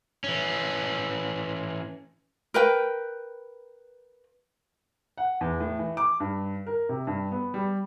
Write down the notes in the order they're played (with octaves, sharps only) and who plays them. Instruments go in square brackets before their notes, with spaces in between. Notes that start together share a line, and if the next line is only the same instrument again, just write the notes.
[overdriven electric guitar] E3 C#4
[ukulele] A#4 B4 G5
[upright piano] F#5
E2
A2
E3
D6
G2
A#4
C3
G2
B3
G3